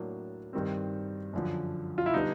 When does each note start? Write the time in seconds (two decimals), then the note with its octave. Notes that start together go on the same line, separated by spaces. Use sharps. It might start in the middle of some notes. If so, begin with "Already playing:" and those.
Already playing: A2 F#3 A#3 D4
0.53 G2 D#3 G3 C4
1.33 F#2 D3 F3
1.98 F4
2.06 E4
2.13 D3 G3 B3 D4 D#4